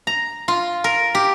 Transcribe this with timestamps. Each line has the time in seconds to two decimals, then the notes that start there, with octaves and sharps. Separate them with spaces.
0.07 A#5
0.48 F4
0.84 A#4
1.15 G4